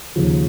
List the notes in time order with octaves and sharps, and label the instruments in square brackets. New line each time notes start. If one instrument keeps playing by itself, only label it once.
[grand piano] D#2 C#3 F3